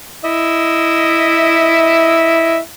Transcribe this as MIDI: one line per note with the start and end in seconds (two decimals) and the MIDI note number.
0.25 2.58 64
0.25 2.58 75
0.25 2.58 76